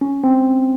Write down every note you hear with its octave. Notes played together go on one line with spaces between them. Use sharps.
C#4
C4